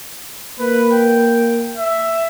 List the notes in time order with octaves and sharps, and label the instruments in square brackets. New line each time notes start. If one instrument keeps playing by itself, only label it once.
[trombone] A#3 [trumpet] B4
[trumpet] G5
E5